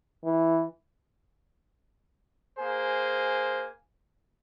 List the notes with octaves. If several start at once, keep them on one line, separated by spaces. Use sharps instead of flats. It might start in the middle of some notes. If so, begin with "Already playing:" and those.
E3
A#3 G#4 C5 G#5